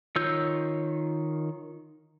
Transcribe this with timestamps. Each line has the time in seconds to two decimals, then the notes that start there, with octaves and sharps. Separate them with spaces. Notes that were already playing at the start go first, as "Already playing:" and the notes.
0.16 D#3 F4 C#5 E6 G6